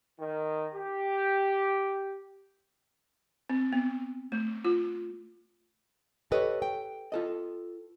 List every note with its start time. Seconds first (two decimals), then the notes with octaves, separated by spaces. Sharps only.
0.19 D#3
0.75 G4
3.49 C4
3.73 B3
4.32 A3
4.65 F4
6.32 G4 A4 B4 C#5 D#5
6.62 G5
7.12 F4 A4 D#5